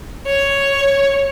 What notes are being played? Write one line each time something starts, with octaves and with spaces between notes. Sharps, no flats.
C#5